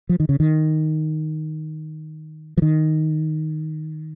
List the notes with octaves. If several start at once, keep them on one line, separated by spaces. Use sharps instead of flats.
F3
D#3
C#3
D#3
F3
D#3